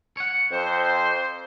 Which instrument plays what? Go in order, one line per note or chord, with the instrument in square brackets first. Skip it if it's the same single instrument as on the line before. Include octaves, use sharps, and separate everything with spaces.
[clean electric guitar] C#5 F#5
[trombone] F2 [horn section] C5